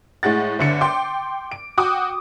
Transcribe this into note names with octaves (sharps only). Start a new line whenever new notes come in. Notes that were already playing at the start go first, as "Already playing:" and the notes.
A2 G#3 F#5 A6
G1 D3 C#7
G5 C6 D6
D7
F#4 G5 D6 D#6